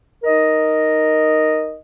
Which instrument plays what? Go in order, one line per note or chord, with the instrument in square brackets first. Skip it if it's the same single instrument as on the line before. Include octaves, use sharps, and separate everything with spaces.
[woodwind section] D#4 A#4 D#5